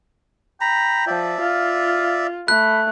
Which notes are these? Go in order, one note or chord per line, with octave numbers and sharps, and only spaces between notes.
G5 A#5 B5
F3 D5 E5
F4 F5
A3 B5 F#6